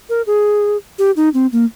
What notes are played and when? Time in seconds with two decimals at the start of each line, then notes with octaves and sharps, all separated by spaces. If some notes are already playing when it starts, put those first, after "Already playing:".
0.09 A#4
0.27 G#4
0.99 G4
1.16 D#4
1.34 C4
1.52 A#3